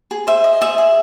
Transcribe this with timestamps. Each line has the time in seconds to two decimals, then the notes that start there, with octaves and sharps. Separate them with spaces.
0.11 G#4
0.27 C5 E5
0.44 D#5
0.61 G#4 E5
0.78 G#4